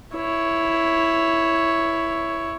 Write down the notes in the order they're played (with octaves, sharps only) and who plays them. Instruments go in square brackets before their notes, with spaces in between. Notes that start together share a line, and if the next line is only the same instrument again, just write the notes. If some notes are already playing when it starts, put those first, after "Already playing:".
[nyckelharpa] E4 C#5